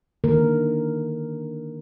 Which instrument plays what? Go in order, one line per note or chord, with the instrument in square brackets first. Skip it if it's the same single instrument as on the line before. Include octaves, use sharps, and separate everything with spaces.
[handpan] D3 D#3 A#3 A#4